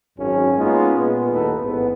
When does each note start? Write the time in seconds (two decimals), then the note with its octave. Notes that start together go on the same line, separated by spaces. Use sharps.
0.18 G#1 F#2 C#4
0.57 G#3 A#3 B3 C#4 D#4 F4
0.96 A#2 G#3 B3
1.33 D#2 A2 D#4 A4 B4
1.63 A1 G#2 B3